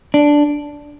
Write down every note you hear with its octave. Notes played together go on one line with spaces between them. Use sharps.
D4